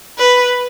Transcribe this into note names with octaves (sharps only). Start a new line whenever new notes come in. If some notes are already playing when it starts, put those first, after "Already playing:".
B4